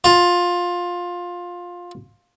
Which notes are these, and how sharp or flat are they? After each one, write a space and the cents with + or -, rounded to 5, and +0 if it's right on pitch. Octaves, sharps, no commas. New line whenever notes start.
F4 +15